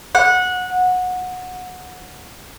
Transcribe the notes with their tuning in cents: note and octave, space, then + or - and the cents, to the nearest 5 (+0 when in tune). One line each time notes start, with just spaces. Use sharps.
F#5 -20